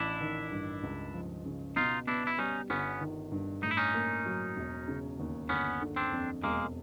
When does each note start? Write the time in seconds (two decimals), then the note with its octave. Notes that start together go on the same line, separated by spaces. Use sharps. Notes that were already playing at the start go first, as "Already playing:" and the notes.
Already playing: A1 D4 E4
0.21 D#3
0.52 G2
0.83 C#2
1.14 F3
1.45 C#3
1.76 B2 D#4 F4
2.07 B3 D4 E4
2.27 E4
2.39 G3 C#4 D#4
2.70 G1 B3 C#4
3.01 D#3
3.32 G2
3.63 A2 D#4
3.71 E4
3.77 C#4 D#4
3.94 A#3
4.25 F#3
4.57 E1
4.88 C#3
5.19 D#2
5.49 G1 B3 C#4
5.81 D3
5.96 C4 D4
6.12 F2
6.44 E1 G#3 A#3